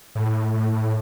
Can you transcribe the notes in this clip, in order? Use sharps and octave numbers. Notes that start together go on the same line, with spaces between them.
A2
A2
A2